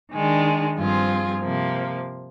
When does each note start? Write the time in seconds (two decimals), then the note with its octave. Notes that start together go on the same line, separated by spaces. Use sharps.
0.12 D#3 G#3 D4
0.76 G2 F3 C4 F4 G#4
1.41 C3 F3 A#3